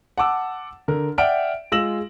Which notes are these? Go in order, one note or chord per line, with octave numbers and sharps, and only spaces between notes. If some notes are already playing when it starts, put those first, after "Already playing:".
F#5 A5 D6 E6
D3 A#4
D5 E5 F#5 G5 F6 D7
G#3 F4 E6 A#6 E7 F#7